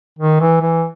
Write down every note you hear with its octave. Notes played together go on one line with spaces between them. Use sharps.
D#3
E3
E3